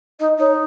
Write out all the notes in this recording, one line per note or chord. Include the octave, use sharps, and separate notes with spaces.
D#4 D#5
D#4 C#5